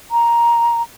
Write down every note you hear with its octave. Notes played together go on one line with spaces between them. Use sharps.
A#5